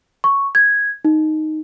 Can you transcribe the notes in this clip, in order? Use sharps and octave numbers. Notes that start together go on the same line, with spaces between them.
C#6
G#6
D#4